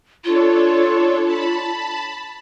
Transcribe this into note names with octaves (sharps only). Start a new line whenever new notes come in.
D4 F4 A4 C#5
A5 B5